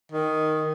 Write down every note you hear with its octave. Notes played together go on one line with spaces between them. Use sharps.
D#3